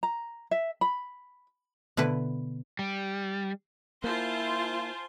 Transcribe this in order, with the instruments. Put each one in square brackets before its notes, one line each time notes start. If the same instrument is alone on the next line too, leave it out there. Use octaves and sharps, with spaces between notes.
[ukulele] A#5
E5
B5
[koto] B2 D3 E4 B4
[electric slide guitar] G3
[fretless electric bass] A#3 [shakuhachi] E4 [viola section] F4 C5 A5 [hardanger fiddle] G#5 C6